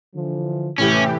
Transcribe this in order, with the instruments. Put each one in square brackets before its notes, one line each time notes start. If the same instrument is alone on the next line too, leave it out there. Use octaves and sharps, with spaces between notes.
[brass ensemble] D3 E3 F3
[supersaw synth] A2 E3 G4 [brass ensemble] C3 E4 [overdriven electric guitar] C#4